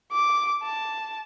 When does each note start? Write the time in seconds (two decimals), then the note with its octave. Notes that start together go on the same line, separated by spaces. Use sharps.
0.12 D6
0.63 A5